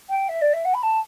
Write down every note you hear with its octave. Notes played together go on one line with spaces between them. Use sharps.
G5
E5
D5
E5
F#5
B5
A5